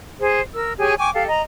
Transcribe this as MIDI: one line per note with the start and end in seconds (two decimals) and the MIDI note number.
0.21 0.41 68
0.21 0.41 72
0.54 0.73 70
0.54 0.73 88
0.79 0.95 67
0.79 0.95 68
0.79 0.95 73
0.79 0.95 80
0.98 1.10 79
0.98 1.10 80
0.98 1.10 85
0.98 1.10 86
1.14 1.26 67
1.14 1.26 69
1.14 1.26 77
1.28 1.42 75
1.28 1.42 82